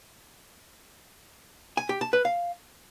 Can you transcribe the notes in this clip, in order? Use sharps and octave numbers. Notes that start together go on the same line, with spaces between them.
G#5
G4
A5
B4
F5